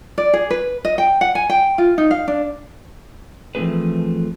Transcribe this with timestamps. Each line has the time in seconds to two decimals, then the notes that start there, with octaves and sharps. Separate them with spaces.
0.18 D5
0.33 G#4
0.50 B4
0.85 D#5
0.98 G5
1.21 F#5
1.35 G#5
1.50 G5
1.78 F4
1.98 D#4
2.11 F5
2.28 D4
3.55 E3 F3 A3 C4 G#4 B4